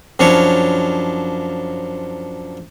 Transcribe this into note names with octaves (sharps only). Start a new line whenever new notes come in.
F#2 F3 D4 E4 C#5